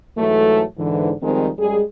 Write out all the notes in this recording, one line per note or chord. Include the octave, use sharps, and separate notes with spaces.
G#2 E3 F#3 A3
G#2 D3 E3
D#3 F3 G3 G#3 C4 D#4
F#2 G3 G#3 G#4